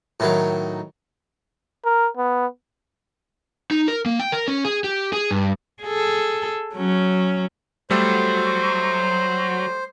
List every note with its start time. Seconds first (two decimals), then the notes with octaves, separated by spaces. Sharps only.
0.20 A2 D#3 F#3
1.85 A#4
2.17 B3
3.71 D#4
3.88 A#4
4.06 A#3
4.20 G5
4.32 A#4
4.48 C#4
4.64 G#4
4.84 G4
5.13 G#4
5.31 G2
5.83 G#4 A4
6.74 F#3 C#4
7.90 F#3 G3 A3 A4 C5